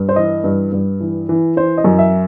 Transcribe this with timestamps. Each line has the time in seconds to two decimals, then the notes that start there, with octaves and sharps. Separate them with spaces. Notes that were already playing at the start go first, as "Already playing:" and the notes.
Already playing: G2
0.09 C5
0.16 E3 D#5
0.44 G2
0.72 G2
1.01 E3
1.29 E3
1.57 E3 C5
1.78 D#5
1.84 F#2
1.99 E5